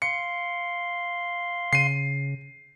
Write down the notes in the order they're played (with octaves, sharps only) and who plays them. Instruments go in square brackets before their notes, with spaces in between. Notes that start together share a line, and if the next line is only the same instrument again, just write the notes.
[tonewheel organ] F5 C6 [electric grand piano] C#7
[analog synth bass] C#3 [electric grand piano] C7 D#7